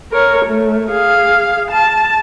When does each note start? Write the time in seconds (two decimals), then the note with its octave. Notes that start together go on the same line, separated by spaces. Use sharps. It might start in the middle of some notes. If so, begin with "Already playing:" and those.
0.12 A#4 C#5
0.46 A3
0.92 G#4 F5
1.71 A5